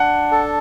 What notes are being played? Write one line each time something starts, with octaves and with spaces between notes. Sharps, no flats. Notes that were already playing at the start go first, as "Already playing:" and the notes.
Already playing: D4 F#5
A4